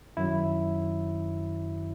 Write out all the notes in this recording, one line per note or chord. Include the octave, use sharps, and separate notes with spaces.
F#2 D#3 F#3 E4